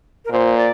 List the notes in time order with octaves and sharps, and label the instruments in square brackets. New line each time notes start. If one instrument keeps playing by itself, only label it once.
[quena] A#4
[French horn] A#2 [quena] C5
[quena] D5